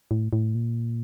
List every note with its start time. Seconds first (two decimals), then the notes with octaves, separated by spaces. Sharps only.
0.11 A2
0.33 A2
0.55 A#2